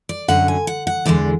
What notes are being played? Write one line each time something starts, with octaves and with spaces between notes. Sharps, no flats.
D5
F#2 D3 F#3 F#5
G#5
F#5
F#5
E2 D3 G#3 D5